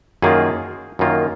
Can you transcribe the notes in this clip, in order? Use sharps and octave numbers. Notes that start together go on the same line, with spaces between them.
F#2 D#3 A#3 F4 G#4
F#2 D#3 A#3 F4